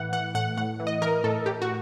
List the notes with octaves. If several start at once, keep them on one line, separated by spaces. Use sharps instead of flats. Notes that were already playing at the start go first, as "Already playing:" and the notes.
Already playing: A2 E3 F#5
E3 F#5
A2 F#5
A2 F#5
E3
D#5
E3 A#4
A2 A4
A2 G4
F#4